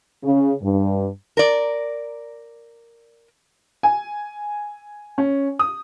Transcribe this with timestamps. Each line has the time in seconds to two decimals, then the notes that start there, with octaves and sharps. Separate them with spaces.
0.23 C#3
0.62 G2
1.37 A#4 D5
3.83 G#5
5.18 C#4
5.59 D#6